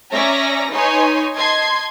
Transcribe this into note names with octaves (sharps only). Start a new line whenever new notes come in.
C#4 C#5 D5 E5 A#5 A#6
D#4 B4 C#5 G#5 C6
D#5 A5 C6 G#6 C7